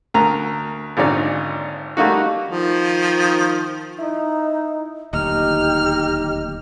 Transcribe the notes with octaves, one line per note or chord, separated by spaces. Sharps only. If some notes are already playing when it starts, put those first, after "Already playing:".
D2 A#4 A#5
G#1 A#2 D3 C#4 D#4 D5
G3 A3 A#3 D#4 F#4
D#3 F3
D#4 E4
D1 D#2 D#4 G4 F6